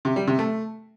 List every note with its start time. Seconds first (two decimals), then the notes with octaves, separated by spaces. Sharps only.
0.05 C3
0.16 G3
0.27 C3
0.39 A3